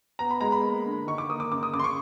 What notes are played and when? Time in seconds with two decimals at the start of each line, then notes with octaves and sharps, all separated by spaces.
0.19 B3 A#5
0.31 B5
0.41 G#3 A#5
0.52 B5
0.63 A#3
0.86 D3
1.07 D#3 C#6
1.18 D6
1.29 A#3 D#6
1.40 D6
1.52 C#3 D6
1.63 D#6
1.74 C#3 D6
1.79 C6
1.84 C#6